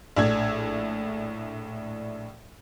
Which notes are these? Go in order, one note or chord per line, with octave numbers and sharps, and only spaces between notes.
A#1 A2 D4 E6 G#6